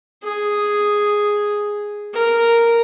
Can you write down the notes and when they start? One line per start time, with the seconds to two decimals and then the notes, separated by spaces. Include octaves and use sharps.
0.23 G#4
2.13 A#4